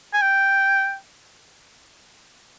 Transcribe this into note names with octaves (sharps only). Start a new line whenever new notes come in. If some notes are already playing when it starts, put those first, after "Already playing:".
G#5
G5